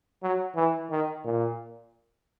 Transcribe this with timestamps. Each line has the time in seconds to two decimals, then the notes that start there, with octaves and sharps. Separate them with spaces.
0.23 F#3
0.55 E3
0.91 D#3
1.25 A#2